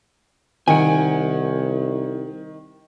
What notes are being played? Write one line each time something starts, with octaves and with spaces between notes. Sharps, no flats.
C2 D#3 F#5 G#5